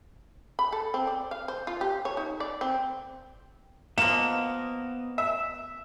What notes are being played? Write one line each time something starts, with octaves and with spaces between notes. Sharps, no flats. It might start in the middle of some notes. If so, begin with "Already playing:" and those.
B5
A4
C4
D5
F5
C5
F4
G4
C#5
D#4
D5
C4
F3 A#3 B3 D#5 E7
E5